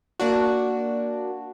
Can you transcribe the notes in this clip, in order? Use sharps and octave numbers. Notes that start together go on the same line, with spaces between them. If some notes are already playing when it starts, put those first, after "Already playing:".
A#3 D4 F#4